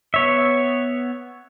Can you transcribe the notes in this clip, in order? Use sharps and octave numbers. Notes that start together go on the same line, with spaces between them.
B3 C#5 E5